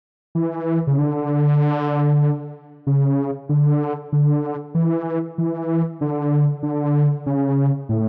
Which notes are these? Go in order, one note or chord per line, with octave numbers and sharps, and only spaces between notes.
E3
C#3
D3
C#3
D3
D3
E3
E3
D3
D3
C#3
A2